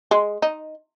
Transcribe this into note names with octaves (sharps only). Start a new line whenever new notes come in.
G#3
D#4